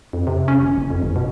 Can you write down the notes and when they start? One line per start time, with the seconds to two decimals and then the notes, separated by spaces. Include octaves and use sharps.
0.13 F2
0.27 C3
0.48 C#4
0.62 G1
0.77 F#1
0.90 F2
1.02 G1
1.16 B2